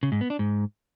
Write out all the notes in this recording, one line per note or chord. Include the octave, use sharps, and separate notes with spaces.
C#3
G#2
B3
D4
G#2